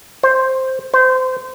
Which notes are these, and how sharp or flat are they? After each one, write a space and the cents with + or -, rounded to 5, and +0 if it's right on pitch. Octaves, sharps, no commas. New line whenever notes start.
C5 +5
C5 -25